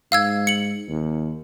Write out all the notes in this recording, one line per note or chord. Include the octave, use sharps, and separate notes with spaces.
G#2 F5 E6 G#6
C#7 F#7
D#2